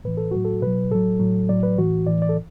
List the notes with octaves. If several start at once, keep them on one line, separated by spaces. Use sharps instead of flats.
A2 E3 B4
A4
A2 F#3 F#4
A4
B2 F#3 B4
A2 F#3 A4
A2 F#3
A2 F#3 D5
B4
A2 E3 F#4
A2 E3 D5
D5
A4